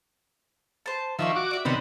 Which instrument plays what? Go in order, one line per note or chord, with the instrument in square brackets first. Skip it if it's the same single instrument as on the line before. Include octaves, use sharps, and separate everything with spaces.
[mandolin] C5 A5
[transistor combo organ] D#3 F3 E5 [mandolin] F4 D5 C#6
[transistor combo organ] F#4 D6
[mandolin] D5 E5
[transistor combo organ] C3 D#3 B3 [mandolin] C#4 D4 C5